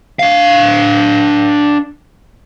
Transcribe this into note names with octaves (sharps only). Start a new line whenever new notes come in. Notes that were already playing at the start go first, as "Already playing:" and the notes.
D4 F5